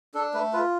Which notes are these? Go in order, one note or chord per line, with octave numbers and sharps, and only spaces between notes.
D4 A4
A3 B4
F4 B4